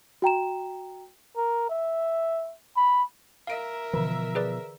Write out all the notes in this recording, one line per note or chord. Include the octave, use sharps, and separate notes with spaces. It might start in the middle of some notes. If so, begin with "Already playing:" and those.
F#4 G5 A#5 E7
A#4
E5
B5
A#4 E5 F5 D7
B2 D3 E3 F3
G#4 B4 D5